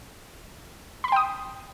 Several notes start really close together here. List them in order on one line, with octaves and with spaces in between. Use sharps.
B5 C6 G5 D#6